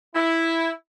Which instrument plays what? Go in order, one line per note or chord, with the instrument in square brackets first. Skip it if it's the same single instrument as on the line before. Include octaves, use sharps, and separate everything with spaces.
[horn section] E4